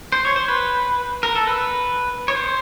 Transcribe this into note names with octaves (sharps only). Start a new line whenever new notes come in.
C5
C#5
C5
B4
A#4
A4
B4
C#5
C5